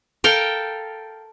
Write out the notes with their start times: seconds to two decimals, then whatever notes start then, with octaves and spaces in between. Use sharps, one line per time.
0.24 A4 A#4 F5 G5